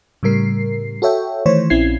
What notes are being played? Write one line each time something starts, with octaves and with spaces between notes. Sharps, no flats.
A2 C#3 G3 A#4 C7
F#4 A4 C#5 E5 G5
D#3 E3 A3 C5 C#5
A#1 C4 C#4 E4 G#6 C7